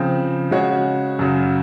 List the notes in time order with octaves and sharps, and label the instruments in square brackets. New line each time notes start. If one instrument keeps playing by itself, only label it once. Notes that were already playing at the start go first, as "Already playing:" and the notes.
Already playing: [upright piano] C#3 F3 C4
C#3 G#3 C#4 F#4 C#5
F#2 C#3 F#3